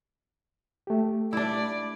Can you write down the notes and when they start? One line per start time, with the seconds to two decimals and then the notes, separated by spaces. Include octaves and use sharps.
0.87 A3 G4
1.33 D4 E4 D5